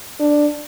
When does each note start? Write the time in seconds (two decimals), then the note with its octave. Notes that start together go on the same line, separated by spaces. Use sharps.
0.20 D4